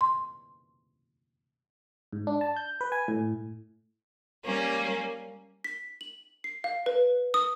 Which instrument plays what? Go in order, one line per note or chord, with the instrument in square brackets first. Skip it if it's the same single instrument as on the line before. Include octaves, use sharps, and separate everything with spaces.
[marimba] C6
[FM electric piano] G#2
D4
A5
G6
B4
G#5
A2
[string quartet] G3 A#3 C#4
[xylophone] B6
F#7
C7
F5
B4
D#6